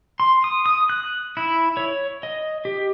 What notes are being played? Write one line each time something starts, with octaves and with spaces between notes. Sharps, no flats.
C6
D#6
D#6
F#6
E4
C#5
D#5
G4